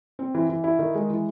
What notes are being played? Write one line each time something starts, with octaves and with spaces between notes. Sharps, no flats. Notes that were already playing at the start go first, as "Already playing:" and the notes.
C4
E3
E3
E4
D#3
G#3
E3